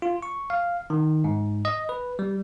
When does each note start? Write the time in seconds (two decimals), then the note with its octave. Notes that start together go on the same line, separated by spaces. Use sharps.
0.02 F4
0.22 C#6
0.50 F5
0.90 D#3
1.24 G#2
1.65 D#5
1.89 B4
2.19 G3